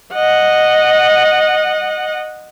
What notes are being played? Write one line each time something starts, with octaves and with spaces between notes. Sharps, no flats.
D#5 F#5